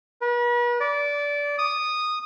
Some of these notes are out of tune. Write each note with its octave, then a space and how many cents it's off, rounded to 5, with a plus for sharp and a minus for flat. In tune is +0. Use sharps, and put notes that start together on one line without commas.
B4 -40
D5 -20
D#6 -10